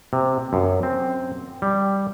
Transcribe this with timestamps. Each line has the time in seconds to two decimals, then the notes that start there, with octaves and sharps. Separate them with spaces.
0.13 C3
0.53 F#2
0.83 C4
1.62 G3